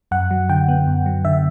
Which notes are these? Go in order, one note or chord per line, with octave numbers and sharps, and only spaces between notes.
F#2 F#5
F#3
D3 G5
B3
F#2
F#3
D3 E5